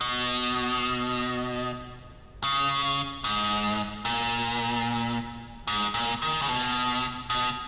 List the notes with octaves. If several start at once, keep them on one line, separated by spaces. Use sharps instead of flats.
B2
C#3
G#2
A#2
G#2
A#2
D#3
C#3
B2
B2